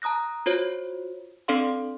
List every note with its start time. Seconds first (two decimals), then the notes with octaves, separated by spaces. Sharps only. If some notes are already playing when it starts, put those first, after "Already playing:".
0.02 A5 A#5 D#6 F#6 A#6
0.46 F4 F#4 C5 C#5
1.48 C4 D4 A4 D5 F5 C6